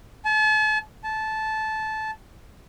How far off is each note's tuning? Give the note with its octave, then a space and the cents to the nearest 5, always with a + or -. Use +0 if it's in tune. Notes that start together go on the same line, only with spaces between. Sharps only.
A5 -40
A5 -15